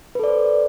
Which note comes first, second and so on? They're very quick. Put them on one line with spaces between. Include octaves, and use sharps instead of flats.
B4 A4 D5 C5